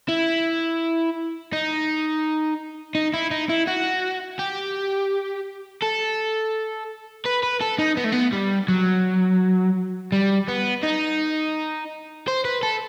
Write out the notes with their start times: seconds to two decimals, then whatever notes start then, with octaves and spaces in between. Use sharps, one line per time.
0.09 E4
1.53 D#4
2.95 D#4
3.14 E4
3.31 D#4
3.50 E4
3.68 F#4
4.39 G4
5.82 A4
7.26 B4
7.43 B4
7.61 A4
7.79 D#4
7.97 B3
8.05 A3
8.13 B3
8.33 G3
8.68 F#3
10.12 G3
10.48 B3
10.83 D#4
12.28 C5
12.45 B4
12.63 A4